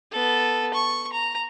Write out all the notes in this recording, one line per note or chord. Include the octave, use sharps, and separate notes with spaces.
B3 A4
C#6
A#5